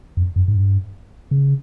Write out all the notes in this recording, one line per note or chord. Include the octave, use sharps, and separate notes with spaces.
F2
F#2
G#2
G2
C#3